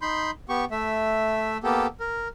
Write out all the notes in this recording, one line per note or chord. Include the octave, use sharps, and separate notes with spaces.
D#4 B5 C6 G6
B3 G4 C#6
A3 E5
A#3 B3 G4 A4
A#4